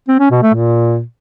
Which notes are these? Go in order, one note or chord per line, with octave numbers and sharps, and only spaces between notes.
C4
C#4
B2
A3
A#2